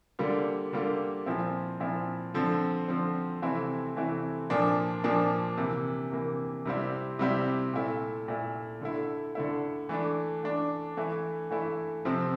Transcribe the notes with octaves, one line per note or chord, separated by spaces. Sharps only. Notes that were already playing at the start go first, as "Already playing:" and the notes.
D3 G3 A#3 F4
D3 G3 A#3 F4
A#2 F3 C4 E4
A#2 F3 C4 E4
D3 F3 C4
D3 F3 C4
C3 E3 A3 C4 E4
C3 E3 A3 C4 E4
A#2 F3 A#3 D4
A#2 F3 A#3 D4
C3 E3 A#3
C3 E3 A#3
C3 G3 C4 E4
C3 G3 C4 E4
A#2 A3 E4
A#2 A3 E4
D3 A3 E4
D3 A3 E4
E3 A3 D4
E3 A3 D4
E3 A3 E4
E3 A3 E4
C3 F3 C4